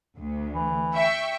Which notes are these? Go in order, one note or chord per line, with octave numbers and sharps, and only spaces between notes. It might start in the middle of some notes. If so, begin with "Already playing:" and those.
D2
E3
E5 G5 C#6